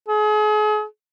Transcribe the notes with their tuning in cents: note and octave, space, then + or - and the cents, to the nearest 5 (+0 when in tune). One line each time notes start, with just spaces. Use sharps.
G#4 +40